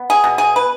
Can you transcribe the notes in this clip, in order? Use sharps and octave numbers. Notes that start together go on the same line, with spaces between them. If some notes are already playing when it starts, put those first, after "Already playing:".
Already playing: B3
G#4
B2
G#4
B4